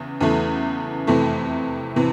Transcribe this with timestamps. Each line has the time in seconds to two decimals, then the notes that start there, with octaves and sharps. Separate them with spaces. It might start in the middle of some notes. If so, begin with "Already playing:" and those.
Already playing: E2 C#3
0.21 E2 C#3 E3 A3
1.07 F2 C3 E3 A3
1.96 C3 E3